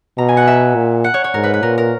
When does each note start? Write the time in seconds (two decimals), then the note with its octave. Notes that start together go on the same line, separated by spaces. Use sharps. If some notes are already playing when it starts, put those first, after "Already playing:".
0.18 B2 A#5
0.29 G#5
0.37 F#5
0.47 E5
0.76 A#2
1.04 F#5
1.14 C#5
1.24 C#5
1.34 G#2 A#4
1.44 B4
1.54 B4
1.62 A#2 A#4
1.78 A#4